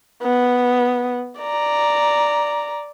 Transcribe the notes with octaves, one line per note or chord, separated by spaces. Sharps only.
B3
D5 A#5